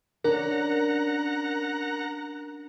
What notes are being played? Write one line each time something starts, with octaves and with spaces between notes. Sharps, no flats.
C#4 D4 A#4 F#5 A#5